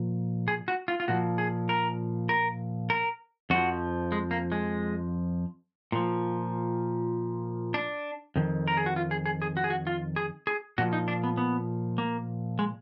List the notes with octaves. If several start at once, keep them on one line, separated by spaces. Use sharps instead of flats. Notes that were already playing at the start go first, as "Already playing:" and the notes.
Already playing: A#2 F3
G#4
F#4
F4
F4
A#2 F3 F#4
G#4
A#4
A#4
A#4
F2 F3 F#4
G#3
A#3
G#3
A#2 F3
D4
F2 D#3
A#4
G#4
F#4
F4
G#4
G#4
G#4
F#4
G#4
F#4
F4
G#4
G#4
A#2 F3 F#4
D#4
D4
B3
B3
A#3
G#3